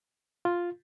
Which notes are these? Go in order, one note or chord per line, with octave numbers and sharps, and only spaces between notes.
F4